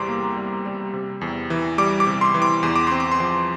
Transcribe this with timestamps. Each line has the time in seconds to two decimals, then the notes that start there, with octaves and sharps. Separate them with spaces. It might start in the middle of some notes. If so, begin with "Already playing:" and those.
Already playing: E2 C3 G3 A#5 C6 D6
0.09 A#3
0.37 G3
0.66 G3
0.93 C3
1.21 E2
1.50 E3
1.78 G3 D6
2.00 D6
2.07 C3
2.21 C6
2.34 E3
2.42 D6
2.63 E2 C6
2.76 D6
2.87 C4 C6
3.00 D6
3.12 C6
3.20 F3